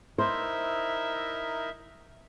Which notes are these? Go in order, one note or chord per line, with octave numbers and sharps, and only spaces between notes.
D#4 E4 A#4 C5 E5